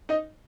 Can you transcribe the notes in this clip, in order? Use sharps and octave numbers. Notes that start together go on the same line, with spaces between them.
D#4 D#5